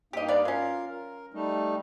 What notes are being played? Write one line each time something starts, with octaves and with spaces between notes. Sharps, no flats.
G2 A#3 D#4 G4 D#5
B3 D5 F5
F#3 C#4 F4 A#4 F5
A#4
G3 A3 D#4